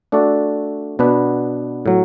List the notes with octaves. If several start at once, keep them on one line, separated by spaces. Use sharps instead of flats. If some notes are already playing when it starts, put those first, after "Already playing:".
A3 D4 F#4 A4 D5
B2 B3 D4 B4
A2 F#3